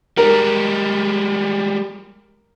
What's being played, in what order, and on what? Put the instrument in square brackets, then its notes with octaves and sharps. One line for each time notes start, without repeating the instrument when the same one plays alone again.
[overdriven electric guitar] G3 G#3 [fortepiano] A#4